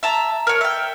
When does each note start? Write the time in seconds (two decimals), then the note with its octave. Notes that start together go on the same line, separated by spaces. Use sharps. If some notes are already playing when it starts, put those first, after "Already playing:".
0.03 E5 A5 A#5
0.47 A#4 C#5
0.61 E5 G5